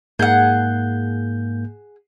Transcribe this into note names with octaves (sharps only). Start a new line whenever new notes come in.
G#2 A#3 G#4 F#5 G6